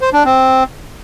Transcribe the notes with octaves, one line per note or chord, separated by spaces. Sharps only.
C5
D4
C4